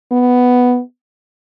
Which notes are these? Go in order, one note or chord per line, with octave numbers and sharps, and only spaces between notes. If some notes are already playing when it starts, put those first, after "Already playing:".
B3